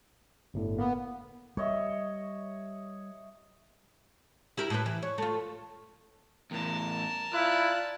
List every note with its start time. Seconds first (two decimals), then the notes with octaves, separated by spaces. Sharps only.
0.54 G1 A2 D3
0.78 A#3 B3
1.57 G3 C#5 D#5 E5
4.57 E4 G4 A#4
4.70 A2 B4
4.86 E3
5.03 C#5
5.18 A3 F4
6.51 E2 A2 A#4 A5
7.33 E4 F4 D5 F#6